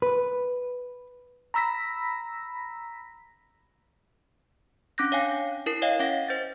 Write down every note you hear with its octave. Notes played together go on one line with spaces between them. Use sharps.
B4
A#5 B5 E6 A#6 B6
C#4 D4 D6 F#6 G6 A#6
C#5 F5 G5 G#5 A#6
E4 A#4 C7
C#5 D#5 F5 G5
C#4 E5 F#5 A#6
C5 G6 A6